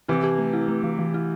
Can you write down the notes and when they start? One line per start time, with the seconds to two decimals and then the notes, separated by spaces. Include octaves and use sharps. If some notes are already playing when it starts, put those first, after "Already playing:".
0.08 C3 E3 E4
0.24 G4
0.38 A3
0.53 E4
0.68 A3
0.84 E3
0.99 E3
1.14 E4